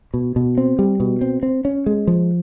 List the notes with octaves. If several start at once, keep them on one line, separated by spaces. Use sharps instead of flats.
B2
B2
C4
G3
B2
C4
C4
C#4
G#3
F3